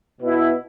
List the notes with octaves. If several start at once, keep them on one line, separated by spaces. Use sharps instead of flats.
B2 B3 E4